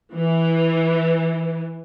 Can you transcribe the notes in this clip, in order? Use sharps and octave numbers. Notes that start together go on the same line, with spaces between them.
E3